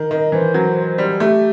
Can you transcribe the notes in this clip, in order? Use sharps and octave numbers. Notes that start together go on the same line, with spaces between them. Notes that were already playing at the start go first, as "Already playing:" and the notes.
Already playing: D#3
D#3 D#5
E3 C5
F#3
G3
A3 G4